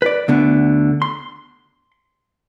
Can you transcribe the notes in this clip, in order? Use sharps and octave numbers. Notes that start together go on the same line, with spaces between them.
B4 D5
D2 D3 B3
C6